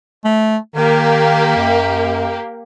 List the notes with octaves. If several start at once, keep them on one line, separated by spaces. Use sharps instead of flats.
A3
D#3 A#3 G4
F#2